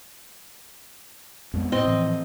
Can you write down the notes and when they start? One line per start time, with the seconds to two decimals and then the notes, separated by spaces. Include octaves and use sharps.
1.54 F2 G#3 B3
1.72 A2 C4 D#5
1.85 A2 E3 F3